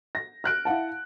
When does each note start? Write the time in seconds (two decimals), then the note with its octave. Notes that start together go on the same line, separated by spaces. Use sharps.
0.15 A#6
0.44 F6 F#6 D7
0.65 E4 F5 F#5 A5